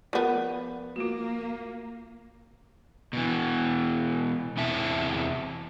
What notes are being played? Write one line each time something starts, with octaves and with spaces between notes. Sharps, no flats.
F3 B3 A#4 D5
A#3 F4 F#4
B2 E3
E2 C3 E4 E5 A5